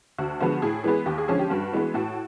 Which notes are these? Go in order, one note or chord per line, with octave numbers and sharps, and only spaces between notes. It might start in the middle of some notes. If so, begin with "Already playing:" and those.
D2 F#4
D3 F3 G#3 B3 F#4
A2 G#4
E3 G#3 B3
D#2 G4
G#4
D3 F3 G#3 C#4 G#4
G4
G2 F#4
E3 G#3 B3
A2 F#4